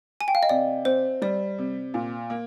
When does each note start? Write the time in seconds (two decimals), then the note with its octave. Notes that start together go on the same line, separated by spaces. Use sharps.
0.21 G#5
0.28 G5
0.35 F5
0.43 D#5
0.49 C3 D5
0.85 C4 C5
1.22 G3 D5
1.58 C3
1.94 A#2
2.30 A#3